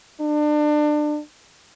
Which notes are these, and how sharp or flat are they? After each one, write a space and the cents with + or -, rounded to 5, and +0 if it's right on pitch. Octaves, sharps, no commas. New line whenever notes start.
D4 +30